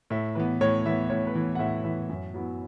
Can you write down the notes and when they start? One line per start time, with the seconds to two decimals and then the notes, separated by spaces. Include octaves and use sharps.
0.10 A2 E5
0.35 E3 B3 B4
0.61 A2 C#5
0.85 E3 B3 E5
1.10 A2 C#5
1.27 B4
1.35 E3 B3
1.55 F#5
1.59 A2 E5
1.84 E3 B3 E5
2.09 F#2
2.34 F#3 B3 E4